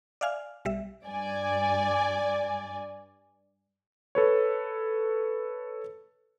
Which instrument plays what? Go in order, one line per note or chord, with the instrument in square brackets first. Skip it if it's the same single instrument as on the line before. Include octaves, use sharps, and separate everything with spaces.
[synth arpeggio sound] D5 E5 F5 G#5 F6
B1 G3 E5
[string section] G2 D5 G#5
[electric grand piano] A4 B4 C#5